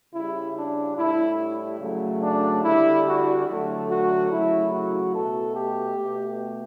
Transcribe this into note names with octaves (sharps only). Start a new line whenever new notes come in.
C#3 G3 E4
D4
A2 G3 E4
C#3 F#3 A3
D4
D3 G3 E4
F#4
D3 F#3 A3
F#4
C#3 F#3 A3 E4
F#4
B2 A3 A4
G4
B2 A3